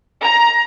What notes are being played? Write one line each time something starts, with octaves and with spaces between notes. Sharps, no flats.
A#5